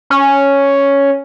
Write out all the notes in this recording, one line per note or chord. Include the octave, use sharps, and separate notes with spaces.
C#4